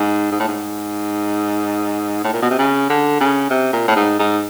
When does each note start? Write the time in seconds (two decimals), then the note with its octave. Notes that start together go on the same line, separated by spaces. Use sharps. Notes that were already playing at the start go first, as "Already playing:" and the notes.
Already playing: G#2
0.31 G#2
0.40 A2
0.48 G#2
2.24 A2
2.33 A#2
2.42 B2
2.50 C3
2.59 C#3
2.90 D3
3.20 C#3
3.50 C3
3.73 A#2
3.88 A2
3.96 G#2
4.19 G#2